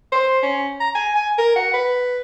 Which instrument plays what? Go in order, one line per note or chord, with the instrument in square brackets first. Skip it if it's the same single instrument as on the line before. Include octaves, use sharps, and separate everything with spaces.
[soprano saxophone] C5
C#4
A#5
G#5
G#5
A#4
F#5
B4